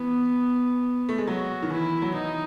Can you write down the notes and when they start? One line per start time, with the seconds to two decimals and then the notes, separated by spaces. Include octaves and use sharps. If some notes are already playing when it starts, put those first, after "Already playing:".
Already playing: E3 B3
1.09 A3
1.18 G#3
1.27 F#3 F#4
1.62 D#3
1.70 E3 E4
2.02 F#3
2.14 E3 D#4